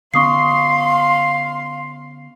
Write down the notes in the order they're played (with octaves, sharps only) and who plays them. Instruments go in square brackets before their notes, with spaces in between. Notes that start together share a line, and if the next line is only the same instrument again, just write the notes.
[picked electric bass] D3 B3 C#4 [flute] F5 [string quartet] C6 [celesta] C#6 D#6 C7